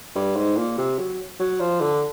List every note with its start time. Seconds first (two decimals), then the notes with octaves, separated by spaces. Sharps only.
0.15 G2
0.36 G#2
0.57 A#2
0.78 C3
0.98 F#3
1.40 F#3
1.60 F3
1.81 D3